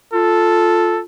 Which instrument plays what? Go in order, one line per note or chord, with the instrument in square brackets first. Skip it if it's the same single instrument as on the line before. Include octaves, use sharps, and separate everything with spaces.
[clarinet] F4 [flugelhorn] A4